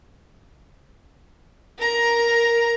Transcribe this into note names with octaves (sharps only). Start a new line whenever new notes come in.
A#4 A#5